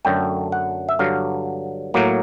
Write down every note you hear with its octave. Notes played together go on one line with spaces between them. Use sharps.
F#2 D3 F#3 A3 G5
F#5
E5
G2 D3 F#3 F5
A2 F#3 A#3